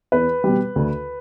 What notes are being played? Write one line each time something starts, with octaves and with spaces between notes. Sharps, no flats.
E2 B4
B2 G3
D2